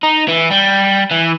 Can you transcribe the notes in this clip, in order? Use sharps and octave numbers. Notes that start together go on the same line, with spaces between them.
D#4
E3
G3
E3